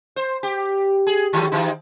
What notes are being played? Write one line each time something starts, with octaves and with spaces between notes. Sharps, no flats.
C5
G4
G#4
D#3 F#3 A3
D#3 E3 D#4